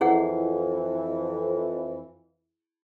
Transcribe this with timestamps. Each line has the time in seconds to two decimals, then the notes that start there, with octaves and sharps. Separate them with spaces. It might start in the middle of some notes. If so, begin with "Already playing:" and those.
0.01 F2 E3 E4 G#4 F#5